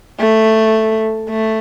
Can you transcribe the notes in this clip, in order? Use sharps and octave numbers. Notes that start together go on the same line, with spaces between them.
A3
A3